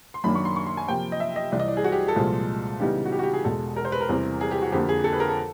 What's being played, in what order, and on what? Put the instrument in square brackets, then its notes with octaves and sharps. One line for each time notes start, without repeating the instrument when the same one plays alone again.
[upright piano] C6
F#2 D#3 F#3 A#3 D4 B5
C#6
C6
C#6
C6
G#5
C3 F3 A#3 G5
D#5
E5
D#5
C2 C3 E3 D5
D#5
D5
G#4
F#4
G4
A4
C2 A#2 F3 G#3
C#3 E3 G3 B3 D#4 G4
F#4
G4
F#4
G4
G#4
E2 B2 G#3 A4
A#4
C5
B4
A#4
E2 C3 E3 G3 C4
G#4
G4
F#4
F2 D3 F3 A#3 G4
G#4
A4
B4
A#4
A4